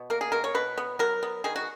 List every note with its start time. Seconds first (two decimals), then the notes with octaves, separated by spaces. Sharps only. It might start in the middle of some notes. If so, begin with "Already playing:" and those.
Already playing: B2
0.10 A#3 A#4
0.21 G#4
0.32 B2 A#4
0.44 C#5
0.55 B2 B4
0.78 B3
0.99 F#3 A#4
1.23 B3
1.44 D#3 G#4
1.56 F#4